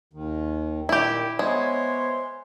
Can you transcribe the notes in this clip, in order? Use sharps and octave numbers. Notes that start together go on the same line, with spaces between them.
D#2 D#3
A#2 D#3 E4 G4
G#3 B3 C5 C#5 E5